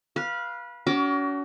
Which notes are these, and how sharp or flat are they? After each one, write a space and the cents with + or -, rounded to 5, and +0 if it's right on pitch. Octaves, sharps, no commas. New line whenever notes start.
B4 -25 F5 +0
C#4 +40 F#4 +25 D6 -5